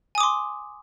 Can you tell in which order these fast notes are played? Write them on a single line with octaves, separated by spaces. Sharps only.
G#5 D#6 D6 C6